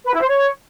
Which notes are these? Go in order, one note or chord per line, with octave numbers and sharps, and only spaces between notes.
B4
E4
C5
C#5